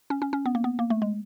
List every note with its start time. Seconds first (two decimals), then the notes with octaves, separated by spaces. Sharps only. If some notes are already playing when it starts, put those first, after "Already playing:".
0.10 C#4
0.22 C#4
0.33 C#4
0.46 B3
0.55 A#3
0.64 B3
0.79 A#3
0.90 A3
1.02 G#3